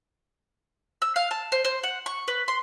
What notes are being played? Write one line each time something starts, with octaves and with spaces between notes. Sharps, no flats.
E6
F5
A5
C5
C5
F#5
C#6
B4
C6